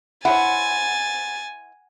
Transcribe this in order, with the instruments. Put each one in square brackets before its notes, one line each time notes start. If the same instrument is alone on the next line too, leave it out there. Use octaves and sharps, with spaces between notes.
[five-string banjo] E4 C5 C#5 [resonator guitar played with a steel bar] F#5 [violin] G#5 A6